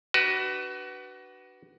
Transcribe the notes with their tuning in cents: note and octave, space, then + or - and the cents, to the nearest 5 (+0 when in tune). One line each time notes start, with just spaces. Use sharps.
D4 +20 F#4 +30 B4 +0